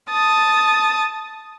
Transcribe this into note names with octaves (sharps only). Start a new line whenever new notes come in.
A5 D#6 A6